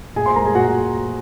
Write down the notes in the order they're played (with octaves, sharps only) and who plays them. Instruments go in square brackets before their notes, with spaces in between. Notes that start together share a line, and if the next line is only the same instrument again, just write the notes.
[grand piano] A#2 G#4 G#5
C5 C6
G#3 A#4 A#5
G#4 G#5
A#2 F#4 F#5